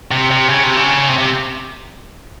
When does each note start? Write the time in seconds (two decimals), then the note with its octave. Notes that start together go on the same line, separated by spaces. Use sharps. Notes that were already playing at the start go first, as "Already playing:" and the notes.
0.11 C3
0.31 C3
0.50 C#3
0.64 C3
0.77 C#3
1.08 C3
1.18 C3